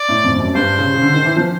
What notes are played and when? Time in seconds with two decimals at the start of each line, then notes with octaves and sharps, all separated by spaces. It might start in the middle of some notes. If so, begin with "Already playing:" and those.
Already playing: D5
0.09 A2
0.24 F2
0.34 F2
0.39 F#2
0.55 G2 C5
0.79 C#3
0.94 C#3
1.02 D3
1.13 D#3
1.25 E3
1.36 F3